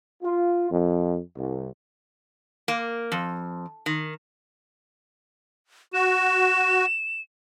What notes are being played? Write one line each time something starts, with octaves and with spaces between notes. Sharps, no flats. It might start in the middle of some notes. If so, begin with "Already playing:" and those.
F4
F2
C2
A#3
F2
D#3
F#4 E7